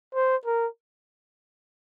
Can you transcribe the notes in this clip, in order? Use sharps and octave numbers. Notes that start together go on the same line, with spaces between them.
C5
A#4